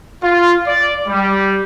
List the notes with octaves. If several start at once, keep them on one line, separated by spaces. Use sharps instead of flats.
F4
D5
G3